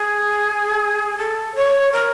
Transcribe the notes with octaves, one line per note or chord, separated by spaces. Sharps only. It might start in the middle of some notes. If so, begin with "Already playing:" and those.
Already playing: G#4
A4
C#5
A#4